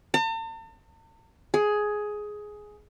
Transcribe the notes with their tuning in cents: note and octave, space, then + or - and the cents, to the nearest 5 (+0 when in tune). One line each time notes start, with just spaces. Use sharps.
A5 +45
G#4 +10